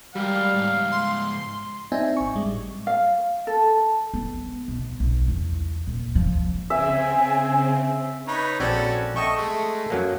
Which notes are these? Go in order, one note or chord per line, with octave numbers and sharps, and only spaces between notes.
G#2 G3 A#4 F5
G#2 C#3
C6
C4 D4 D#4 E5 G#5
G#1 C#6
A2 G3 G#3
F5
A4
B3
B1
B1
E2
A#2
F3
C#3 C4 E5 G#5
D#4 B4 C#5
A#1 C4 C#4 F#4 A4 D5
A4 D#5 E5 G5 C#6
G#3 A3
F#2 F#3 A#3